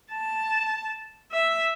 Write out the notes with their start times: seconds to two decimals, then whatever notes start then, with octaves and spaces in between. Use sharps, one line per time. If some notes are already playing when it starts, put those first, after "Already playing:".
0.11 A5
1.32 E5